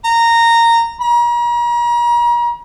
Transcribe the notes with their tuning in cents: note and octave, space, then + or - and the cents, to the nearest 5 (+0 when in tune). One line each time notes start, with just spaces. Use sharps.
A#5 -10
A#5 +40